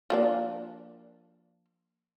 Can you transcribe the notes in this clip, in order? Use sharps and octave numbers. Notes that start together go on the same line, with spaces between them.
F3 A#3 D4